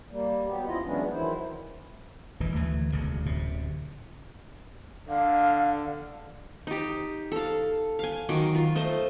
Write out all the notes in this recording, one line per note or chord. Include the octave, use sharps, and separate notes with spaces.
G3 A#3
F#3 B3 G4
D2 C#3 F3 E4 F4 D#5
E3 F#3 G#3 B3 C#4 D4
D#3 E3 F#3 E4 C5
D#1 D2 E3
D2 E3 A3
E1 D2 C#3
D1 F#2 C3
D3 F5
D#4 G4
A4 F5
F5 G#5
D#3 F#3 C6 D6
F4
A3 C5 D#5